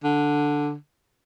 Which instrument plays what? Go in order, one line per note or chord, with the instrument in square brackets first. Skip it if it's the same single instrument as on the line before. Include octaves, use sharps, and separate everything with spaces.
[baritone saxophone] D3